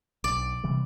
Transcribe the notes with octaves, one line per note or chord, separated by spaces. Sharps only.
B1 D5
C3 E3 G3